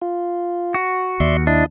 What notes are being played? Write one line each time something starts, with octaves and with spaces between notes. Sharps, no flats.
F4
F#4
D#2 D5 E5 C6
D4 E4 D#5